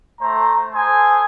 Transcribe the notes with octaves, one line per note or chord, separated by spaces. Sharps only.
A3 C5 A#5
A4 C5 G#5 D#6